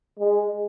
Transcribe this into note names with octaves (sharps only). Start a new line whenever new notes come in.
G#3